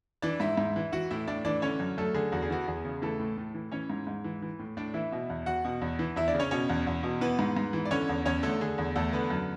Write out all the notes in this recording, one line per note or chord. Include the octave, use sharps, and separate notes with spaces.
E3 D4 D5
G#2 E4 E5
G#2
E3
E3 F#4 F#5
A2 E4 E5
A2 D4 D5
E3 D4 D5
D3 C#4 C#5
F#2
F#2 A3 A4
D3 G#4
E2 F#4
G#4
E3 F#4
E2 G#4
C#3
E3 A3 A4
A2
A2
E3
E3 C#4 C#5
G#2
G#2
E3
E3
A2
A2 D4 D5
E3 E4 E5
B2
E2
E2 F#4 F#5
B2
E2
E3
E2 E4 E5
D4 D5
C#3
C#4 C#5
B2 C#4 C#5
E2
E2
B2
E3 B3 B4
G#2
G#2
E3
D5
D3 C#4 C#5
E2
E2 C#4 C#5
D3 A3 A4
D3 G#4
E2
E2 A3 A4
D3 B3 B4
F#2